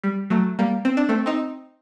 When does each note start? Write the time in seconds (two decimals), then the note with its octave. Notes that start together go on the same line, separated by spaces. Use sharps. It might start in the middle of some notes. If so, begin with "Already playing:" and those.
0.04 G3
0.30 F#3 A3
0.59 G3 A#3
0.85 C4
0.97 D4
1.09 A3 C4
1.26 C4 D#4